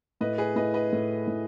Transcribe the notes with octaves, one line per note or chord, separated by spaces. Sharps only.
A2 B4 D#5
G#4 B4
A2 B4 D#5
B4 D#5
A2
A2